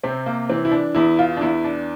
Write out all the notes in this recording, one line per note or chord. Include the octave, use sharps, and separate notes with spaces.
C3 C4
A#3
E3 C4
E4
D4
E2 E4
F4
D4
E2 E4
D4